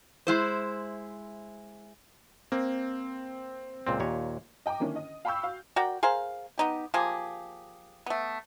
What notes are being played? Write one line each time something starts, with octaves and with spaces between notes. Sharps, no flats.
G#3 E4 C5
A#3 C4
C#2 A#2 C4
D#2 A#2 C#5
D#5 G5 A#5 D6
D3 D#3 A#3 C#4 D4 E4
D#5
F5 G5 B5 C#6 E6 G6
F#4 F5
F#4 A#4 D5 G5
G#4 A#4 C5 F5
B3 D#4 G4
F3 A#3 G4 G#4
A3 B3